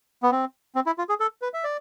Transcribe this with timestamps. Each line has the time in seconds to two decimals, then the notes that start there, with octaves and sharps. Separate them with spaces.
0.23 B3
0.32 C4
0.75 C4
0.86 E4
0.98 F4
1.09 G#4
1.20 A4
1.42 B4
1.54 E5
1.64 D5